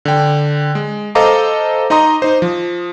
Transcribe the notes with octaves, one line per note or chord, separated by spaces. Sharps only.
D3 G5
G#3
A4 C5 D#5 F5 A#5 D6
D#4 D#5 A#5 C6 D#6 A#6
D#4 C5
F3